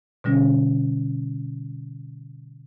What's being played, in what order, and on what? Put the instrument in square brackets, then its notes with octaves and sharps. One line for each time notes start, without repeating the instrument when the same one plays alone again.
[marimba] B2 D3 G3 C#4